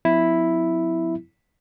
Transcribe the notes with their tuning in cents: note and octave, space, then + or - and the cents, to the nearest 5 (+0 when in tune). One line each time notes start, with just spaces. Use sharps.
F#3 -45 C4 -45 E4 +0